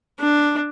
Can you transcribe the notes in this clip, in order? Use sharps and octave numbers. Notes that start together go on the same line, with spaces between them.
D4